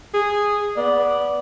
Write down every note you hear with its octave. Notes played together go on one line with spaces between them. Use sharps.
G#4
B3 D5